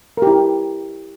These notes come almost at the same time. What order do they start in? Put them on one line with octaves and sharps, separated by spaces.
A#4 G4 E4